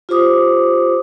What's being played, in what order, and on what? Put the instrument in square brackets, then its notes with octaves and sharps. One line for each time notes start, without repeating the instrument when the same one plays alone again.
[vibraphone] F4 G4 C5 D6 D#6